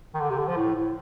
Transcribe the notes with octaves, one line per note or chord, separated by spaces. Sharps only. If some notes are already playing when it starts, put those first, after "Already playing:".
D#3
D3
C3
D3
F3
A2
A2